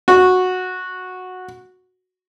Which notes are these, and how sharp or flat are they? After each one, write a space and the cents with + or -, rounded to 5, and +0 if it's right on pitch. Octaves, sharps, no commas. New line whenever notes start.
F#4 -10